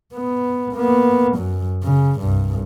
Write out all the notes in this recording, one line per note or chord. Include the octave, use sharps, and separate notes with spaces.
B3
A#3 B3
F#2 F#3
C#3
C2 G2